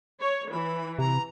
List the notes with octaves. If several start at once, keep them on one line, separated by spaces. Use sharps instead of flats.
C#5
E3 B5
C3 A#5